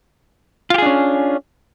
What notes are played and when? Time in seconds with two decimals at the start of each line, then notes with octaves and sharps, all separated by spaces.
0.70 F4
0.74 G4
0.78 G#4
0.82 D4
0.86 C#4